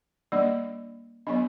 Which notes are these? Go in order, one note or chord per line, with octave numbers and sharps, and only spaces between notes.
G3 A#3 D4 D5
F#3 B3 D4 D#5